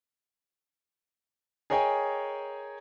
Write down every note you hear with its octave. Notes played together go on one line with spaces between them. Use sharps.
G#4 A#4 C#5 D#5 G5 G#5